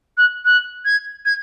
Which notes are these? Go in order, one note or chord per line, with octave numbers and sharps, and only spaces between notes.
F#6
F#6
G#6
G#6